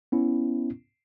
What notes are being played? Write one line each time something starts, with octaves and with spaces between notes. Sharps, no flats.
B3 C#4 E4